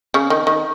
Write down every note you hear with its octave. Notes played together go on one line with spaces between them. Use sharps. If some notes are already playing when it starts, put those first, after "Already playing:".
C#3
D#3
D#3